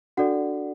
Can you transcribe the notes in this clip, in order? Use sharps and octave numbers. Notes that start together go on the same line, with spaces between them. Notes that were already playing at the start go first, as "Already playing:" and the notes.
D4 F#4 A4 D5 F#5